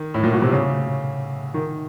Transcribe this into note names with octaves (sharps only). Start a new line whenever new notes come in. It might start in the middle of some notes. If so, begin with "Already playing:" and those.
Already playing: D#3
A2
A#2
B2
C3
C#3
D#3